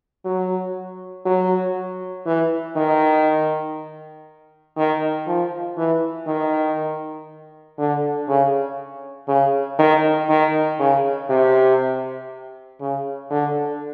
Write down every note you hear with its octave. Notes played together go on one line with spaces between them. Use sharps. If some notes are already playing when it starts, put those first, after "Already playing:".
F#3
F#3
E3
D#3
D#3
F3
E3
D#3
D3
C#3
C#3
D#3
D#3
C#3
C3
C#3
D3